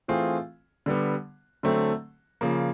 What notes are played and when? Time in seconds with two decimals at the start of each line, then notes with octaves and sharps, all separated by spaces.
0.08 E3 A3 C4 F4 G#4
0.86 D3 G3 B3
1.63 D3 F#3 A3 C4
2.41 C#3 F3 A#3